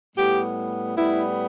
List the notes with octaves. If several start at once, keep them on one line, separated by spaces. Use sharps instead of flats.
A2 G3 B3 G4
A2 G3 B3 E4